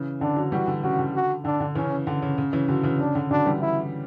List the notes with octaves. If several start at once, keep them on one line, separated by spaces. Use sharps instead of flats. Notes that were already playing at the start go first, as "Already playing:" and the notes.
Already playing: C#3 E3
D3 D4
D3 F#3
E3 G3 F#4
D3
C#3 F#4
D3
F#4
D3 D4
D3
C#3 E3 C#4
D3
C#3
C#3
C#3 E3
D3 F#3
C#3 E3
C#3 D4
D3
D3 F#3 D4
E3 G3
E4